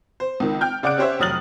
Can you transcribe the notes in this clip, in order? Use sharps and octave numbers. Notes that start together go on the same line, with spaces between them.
C5
C#2 D#3
G5 F6 G6
C#3 D5 F#5 D6 F#6 D7
C#4 G4 C5 C#5 E5
F1 F#3 D#6 F6 A6 F#7